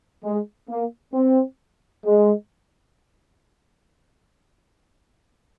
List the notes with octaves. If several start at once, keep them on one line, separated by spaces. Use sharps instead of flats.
G#3
A#3
C4
G#3